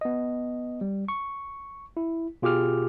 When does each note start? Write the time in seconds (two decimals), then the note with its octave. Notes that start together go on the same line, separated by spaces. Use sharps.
0.01 B3 D#5
0.81 G3
1.08 C#6
1.97 E4
2.42 B2 F4 G4 G#4 D6 F6